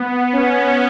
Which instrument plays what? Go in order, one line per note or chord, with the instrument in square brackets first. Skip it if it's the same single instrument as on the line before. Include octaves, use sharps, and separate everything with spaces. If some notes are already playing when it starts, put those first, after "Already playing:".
Already playing: [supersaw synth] B3
C#4